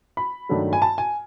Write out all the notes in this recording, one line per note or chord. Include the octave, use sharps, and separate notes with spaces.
B5
G2 D#3 F#3 A3
G#5
A5
G#5